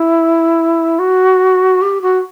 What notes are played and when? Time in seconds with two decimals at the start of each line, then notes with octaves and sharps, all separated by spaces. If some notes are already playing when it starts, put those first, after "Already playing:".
Already playing: E4
0.99 F#4
1.82 G4
2.02 F#4